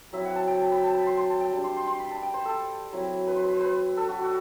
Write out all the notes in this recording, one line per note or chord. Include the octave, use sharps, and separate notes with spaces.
F#3 C4 E4 E5
F#5
A5
G5
A5
B5
A5
B5
C6
C6
A5
G5
G3 D4 A5
C6
C6
C6
B5
A5
G5
C5
A4
F#3 C4 E4
B4
C5
B4
C5
B4
A4
F#4
F#4